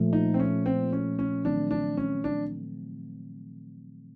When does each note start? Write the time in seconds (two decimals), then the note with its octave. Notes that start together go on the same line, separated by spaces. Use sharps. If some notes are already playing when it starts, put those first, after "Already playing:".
Already playing: A#2 F3 A3
0.13 D#4
0.34 C4
0.40 C#4
0.66 C4
0.93 C#4
1.19 C#4
1.45 D#3 F#3 A3 C4 D4
1.71 D4
1.97 C#4
2.24 D4